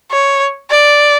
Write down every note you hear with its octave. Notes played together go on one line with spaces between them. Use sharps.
C#5
D5